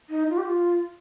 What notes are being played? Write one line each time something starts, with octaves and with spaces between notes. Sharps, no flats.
D#4
F4
G4
F4